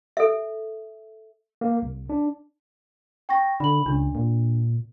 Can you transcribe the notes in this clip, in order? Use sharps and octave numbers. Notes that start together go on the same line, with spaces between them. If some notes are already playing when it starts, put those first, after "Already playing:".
A4 E5
A#3
C2
D4
G5 C#6 A#6
D3 B5 F#7
C#2 D4
A#2